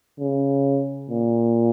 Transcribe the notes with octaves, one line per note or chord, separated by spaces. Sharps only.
C#3
A#2